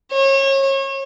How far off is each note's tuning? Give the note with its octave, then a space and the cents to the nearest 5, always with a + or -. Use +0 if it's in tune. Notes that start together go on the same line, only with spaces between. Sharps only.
C#5 -30